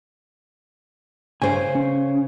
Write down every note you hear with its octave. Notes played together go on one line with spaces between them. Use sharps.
C#3 C5 G#5
C#4